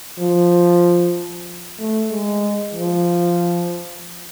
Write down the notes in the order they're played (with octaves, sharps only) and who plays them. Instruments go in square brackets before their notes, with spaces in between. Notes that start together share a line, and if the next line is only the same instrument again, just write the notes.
[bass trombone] F3
A3
G#3
F3